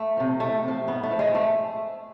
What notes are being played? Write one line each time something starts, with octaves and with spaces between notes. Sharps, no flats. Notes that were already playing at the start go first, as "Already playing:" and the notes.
Already playing: A3
C3 F3
E2 A3
C3 F3
G#2 B3
A3
F3
G#3
A3